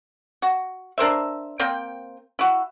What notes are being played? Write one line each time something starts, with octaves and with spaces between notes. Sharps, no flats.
F#4
D4 A#4 C5 E5
A#3 C4 G5
E4 F#4